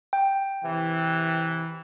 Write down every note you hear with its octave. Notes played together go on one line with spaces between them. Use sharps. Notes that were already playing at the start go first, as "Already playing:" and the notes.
G5
C3 E3